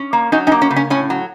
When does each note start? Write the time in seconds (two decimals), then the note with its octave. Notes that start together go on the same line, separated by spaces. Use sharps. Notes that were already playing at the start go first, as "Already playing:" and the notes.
Already playing: C#4
0.13 A#3
0.32 F#3 C#4 D#4
0.47 C#4 D#4
0.52 A#3
0.62 C#4
0.71 C#3
0.76 C#4
0.90 A2 C#4
1.10 F#3